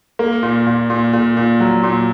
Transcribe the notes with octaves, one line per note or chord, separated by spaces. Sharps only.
A#3
A#2
A#2
A#2
A#2
A#2
F#3
A#2